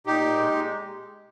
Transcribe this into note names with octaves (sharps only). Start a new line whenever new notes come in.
A#2 D#4 G4
A#2
G#3
G#3